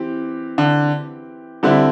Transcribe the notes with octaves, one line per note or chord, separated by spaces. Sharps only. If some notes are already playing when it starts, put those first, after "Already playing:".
Already playing: E3 C4 G4
D3
D3 G3 C4 E4